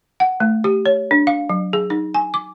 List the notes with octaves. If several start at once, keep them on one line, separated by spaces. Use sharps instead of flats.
F#5
A3
G4
C#5
D4
F5
F#3
G#4
D#4
G#5
D6